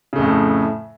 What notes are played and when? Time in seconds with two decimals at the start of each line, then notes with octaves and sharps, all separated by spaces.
0.13 C#3
0.16 A3
0.18 F2
0.21 A2